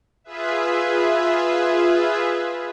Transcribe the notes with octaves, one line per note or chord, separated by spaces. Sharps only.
F4 G#4 B4 E5